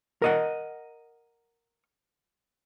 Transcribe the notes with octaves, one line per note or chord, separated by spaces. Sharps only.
A#4 D#5 F#5